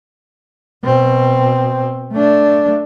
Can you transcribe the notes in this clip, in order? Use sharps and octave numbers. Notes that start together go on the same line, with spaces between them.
B2 C4
A3 D4